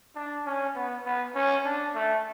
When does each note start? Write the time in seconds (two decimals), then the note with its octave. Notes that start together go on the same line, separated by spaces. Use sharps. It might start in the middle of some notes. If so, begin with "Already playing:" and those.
0.16 D4
0.46 C#4
0.75 B3
1.06 B3
1.35 C#4
1.65 D4
1.95 A3